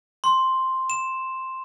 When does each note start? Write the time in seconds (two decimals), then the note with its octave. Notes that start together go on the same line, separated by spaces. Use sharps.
0.24 C6
0.90 E7